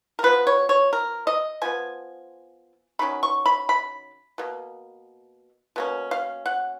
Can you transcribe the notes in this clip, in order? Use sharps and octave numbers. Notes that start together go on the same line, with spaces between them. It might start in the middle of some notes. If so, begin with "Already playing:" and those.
A#4
F3 B3 B4
C#5
C#5
A#4
D#5
F3 B3 G#5
D#3 F#3 C#4 B5
C#6
B5
B5
B2 A#3
B2 A#3 C#4
F5
F#5